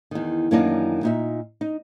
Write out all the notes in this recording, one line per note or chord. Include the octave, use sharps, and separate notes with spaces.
E2 D#3
F#2 D#3 E3 A#3 D4 D#4
A#2 D#4 E5
D#4